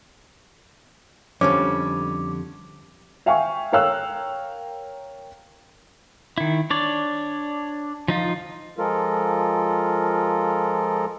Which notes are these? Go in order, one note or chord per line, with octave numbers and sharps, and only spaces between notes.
F2 D3 G3 C#4 D6
E5 F5 G5 G#5 C#6
A#4 C#5 F5 G5 E6 F#6
D#3 E4
D4 C#5 D5
F3 D#4 F4
F3 G#3 F4 A4 A#4